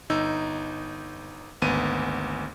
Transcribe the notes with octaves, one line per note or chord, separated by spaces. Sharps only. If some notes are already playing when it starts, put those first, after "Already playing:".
G1 D#4 E6
G#1 D2 B3 D#7